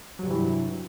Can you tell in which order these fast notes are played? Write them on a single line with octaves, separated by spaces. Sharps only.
F#3 G2 C3 E3